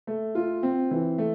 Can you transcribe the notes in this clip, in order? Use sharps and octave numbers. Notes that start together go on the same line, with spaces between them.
A3
F4
C4
E3
A3